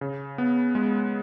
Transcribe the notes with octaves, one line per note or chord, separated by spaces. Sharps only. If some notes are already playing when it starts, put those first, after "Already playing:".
C#3
B3
G#3